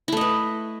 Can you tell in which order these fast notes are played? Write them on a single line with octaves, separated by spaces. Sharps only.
E4 A3 D#5 B4